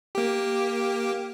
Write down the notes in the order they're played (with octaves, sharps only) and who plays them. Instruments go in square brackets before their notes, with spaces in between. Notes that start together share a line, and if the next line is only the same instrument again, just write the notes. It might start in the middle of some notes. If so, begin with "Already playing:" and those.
[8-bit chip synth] A#3 G4